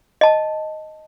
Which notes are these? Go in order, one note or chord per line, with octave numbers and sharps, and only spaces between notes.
D#5 A5